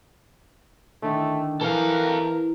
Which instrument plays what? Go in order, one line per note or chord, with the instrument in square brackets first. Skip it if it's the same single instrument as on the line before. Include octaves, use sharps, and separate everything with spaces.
[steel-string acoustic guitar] D3 D#3 [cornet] A3
[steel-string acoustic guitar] E3 [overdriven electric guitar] A4 F5 [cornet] A#4